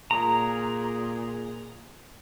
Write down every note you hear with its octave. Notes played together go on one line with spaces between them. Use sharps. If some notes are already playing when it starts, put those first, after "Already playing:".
A#2 G#4 A#5